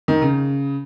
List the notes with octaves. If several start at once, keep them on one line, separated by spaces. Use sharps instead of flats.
D#3
C#3